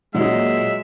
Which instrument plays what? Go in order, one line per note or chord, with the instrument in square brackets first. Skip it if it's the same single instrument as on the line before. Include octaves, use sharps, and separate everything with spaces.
[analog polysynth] A#2 [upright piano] F#3 F#4 [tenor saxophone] G#3 [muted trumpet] E5